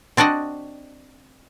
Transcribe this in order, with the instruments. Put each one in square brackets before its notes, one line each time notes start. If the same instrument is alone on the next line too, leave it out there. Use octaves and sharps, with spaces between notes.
[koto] C4 D4 F#4 D5 D#5